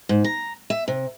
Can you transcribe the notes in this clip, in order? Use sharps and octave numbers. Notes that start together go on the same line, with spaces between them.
G#2
A#5
E5
C3